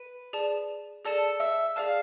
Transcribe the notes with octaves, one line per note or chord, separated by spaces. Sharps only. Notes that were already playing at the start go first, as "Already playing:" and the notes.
Already playing: B4
G#4 D5 A5
G#4 A4 D5 A5
E5
G#4 D5 F5 A5